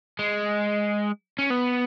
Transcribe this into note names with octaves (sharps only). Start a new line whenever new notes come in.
G#3
C#4
B3